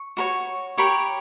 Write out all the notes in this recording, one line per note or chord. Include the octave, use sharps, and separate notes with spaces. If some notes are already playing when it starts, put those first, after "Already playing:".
Already playing: C#6
F#4 A#4 C#5
G4 A#4 C#5 B5 C#6